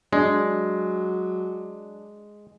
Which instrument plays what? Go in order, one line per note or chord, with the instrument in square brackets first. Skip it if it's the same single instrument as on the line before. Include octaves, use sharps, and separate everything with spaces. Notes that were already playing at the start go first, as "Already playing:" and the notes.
[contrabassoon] F#3 [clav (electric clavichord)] G#3 [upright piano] D4